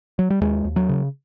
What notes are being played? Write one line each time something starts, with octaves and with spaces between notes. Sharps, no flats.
F#3
G3
D#2 G#3
D#2
F#3
C#3